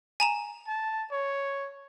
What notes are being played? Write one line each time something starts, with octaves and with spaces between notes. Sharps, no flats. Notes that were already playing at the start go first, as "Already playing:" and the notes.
G#5 A#5 E7
A5
C#5